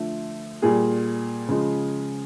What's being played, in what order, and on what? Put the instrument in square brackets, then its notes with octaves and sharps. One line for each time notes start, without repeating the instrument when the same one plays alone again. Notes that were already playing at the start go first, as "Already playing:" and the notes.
Already playing: [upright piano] D3 F3 A3
A#2 G3 G#4
C#3 F3 G#3